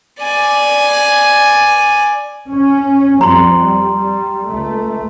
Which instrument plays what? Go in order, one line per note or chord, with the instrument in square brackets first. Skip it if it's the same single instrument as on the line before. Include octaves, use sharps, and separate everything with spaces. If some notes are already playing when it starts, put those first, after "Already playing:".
[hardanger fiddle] D5 G#5
[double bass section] C#4
[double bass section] F2 G3 [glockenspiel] A#5 C6
[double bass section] G3
G3
C#2 A3